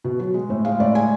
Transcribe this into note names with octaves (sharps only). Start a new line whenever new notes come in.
B2
F#3
G#3
A2
G#3 F5
A2 D5
G#3 G#5